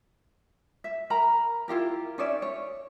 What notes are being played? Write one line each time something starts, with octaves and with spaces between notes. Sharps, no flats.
E5
A#4 A#5 B5
E4 F4 G4 A#4
C#4 D#4 D5 E5
C#5